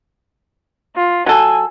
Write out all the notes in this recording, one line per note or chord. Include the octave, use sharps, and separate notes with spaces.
F4
F#3 A4 G#5